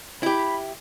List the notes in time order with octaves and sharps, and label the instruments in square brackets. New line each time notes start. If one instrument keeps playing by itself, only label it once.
[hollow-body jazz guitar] E4 G4 [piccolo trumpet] B5